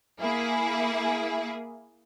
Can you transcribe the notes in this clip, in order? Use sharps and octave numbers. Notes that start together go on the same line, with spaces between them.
A#3 E4 G#4